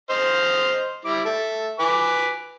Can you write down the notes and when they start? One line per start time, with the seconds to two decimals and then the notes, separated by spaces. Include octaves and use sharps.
0.10 C5 D#5 F6
1.05 G3 E4 D6
1.25 A4 E5
1.80 B4 G#5 D6